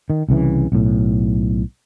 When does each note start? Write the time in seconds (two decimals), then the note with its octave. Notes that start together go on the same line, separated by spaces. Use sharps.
0.10 D#3
0.29 C2 C#3 E3
0.72 B1 A2